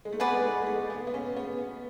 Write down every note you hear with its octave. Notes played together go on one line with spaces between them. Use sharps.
G#3
A3
B3 G#4 B4 D5 F#5
G#3
A3
G#3
A3
B3
B3
C#4
B3